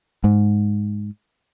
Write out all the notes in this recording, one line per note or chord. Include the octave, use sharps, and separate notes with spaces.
G#2